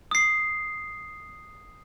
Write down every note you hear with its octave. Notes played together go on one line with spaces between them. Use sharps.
D#6 C7